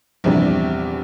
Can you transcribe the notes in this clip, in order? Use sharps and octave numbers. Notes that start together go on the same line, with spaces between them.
A#1 E2 C3 G3